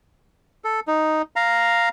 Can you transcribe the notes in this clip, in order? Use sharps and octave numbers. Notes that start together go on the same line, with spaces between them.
A4
D#4
F5 A#5